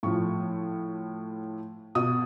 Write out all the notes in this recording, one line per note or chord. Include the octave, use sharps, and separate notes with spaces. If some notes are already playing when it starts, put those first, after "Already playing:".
A2 F3 C#6
B2 D#6